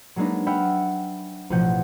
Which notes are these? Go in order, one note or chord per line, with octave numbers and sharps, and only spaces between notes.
F#3 G#3 A#3 D4 D#4 B4
E5 F#5 G5 B5 F6
A1 B2 F3 F#5 G6